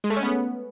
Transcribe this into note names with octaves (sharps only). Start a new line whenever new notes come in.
G#3
A3
C#4
B3